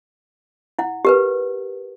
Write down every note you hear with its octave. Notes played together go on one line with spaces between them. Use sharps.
E4 F#5
G4 A#4 B4